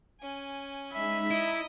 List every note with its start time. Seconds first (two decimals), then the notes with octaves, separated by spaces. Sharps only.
0.21 C#4 G#5
0.94 G#3 D#4 E5 B5
1.30 E4 D#5 A#5 D#6